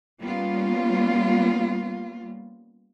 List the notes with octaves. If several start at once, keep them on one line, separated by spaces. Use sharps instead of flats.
G3 A#3 B3 C#4 F4